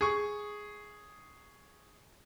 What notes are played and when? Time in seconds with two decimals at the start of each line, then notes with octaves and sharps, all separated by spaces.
0.01 G#4 C#6